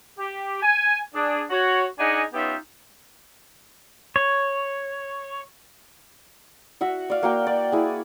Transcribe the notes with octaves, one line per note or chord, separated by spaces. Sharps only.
G4
G#5
D4 G#4
F#4 C#5
D4 D#4 G#4 D#5 F#5 G#5
B3 C#4 D#4 F4 G4 E5
C#5
F#4 E5 F#5
D5 F5
A#3 F#4 G5
D5
E4 G#4